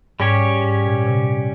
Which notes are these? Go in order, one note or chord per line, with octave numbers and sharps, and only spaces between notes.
G#2 G3 C#4 G4 C#5
G#2
A#2
A#2
C3